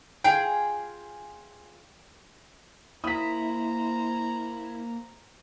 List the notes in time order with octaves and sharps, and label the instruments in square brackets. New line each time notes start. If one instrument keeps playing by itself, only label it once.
[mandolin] F4 G#4 [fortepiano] G5
[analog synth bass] A#3 [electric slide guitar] E4 [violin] C5 A#5 [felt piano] D#6 B6